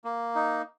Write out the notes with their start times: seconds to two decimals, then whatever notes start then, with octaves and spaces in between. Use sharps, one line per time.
0.04 A#3
0.35 D#4